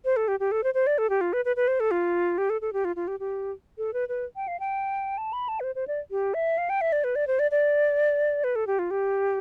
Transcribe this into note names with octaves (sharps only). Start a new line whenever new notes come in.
C5
A4
G4
G4
A4
C5
C5
D5
A4
G4
F4
B4
B4
B4
C5
A4
F4
G4
A4
A4
G4
F4
F4
G4
G4
A4
B4
B4
G5
F5
G5
A5
B5
A5
B4
C5
C5
D5
G4
E5
F5
G5
E5
D5
B4
D5
C5
D5
D5
B4
A4
G4
F4
G4